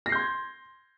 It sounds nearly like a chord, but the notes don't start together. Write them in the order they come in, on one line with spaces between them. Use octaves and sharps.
A#6 C7 G6 C6 G#6